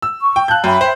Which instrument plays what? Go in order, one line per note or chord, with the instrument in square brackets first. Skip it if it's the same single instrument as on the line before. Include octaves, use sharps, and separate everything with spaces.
[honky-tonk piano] E6
[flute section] C#6
[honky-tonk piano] G5
[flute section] F5 A5 [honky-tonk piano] F#6 G6
[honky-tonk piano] F#2 [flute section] E5 G5 B5
[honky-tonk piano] C5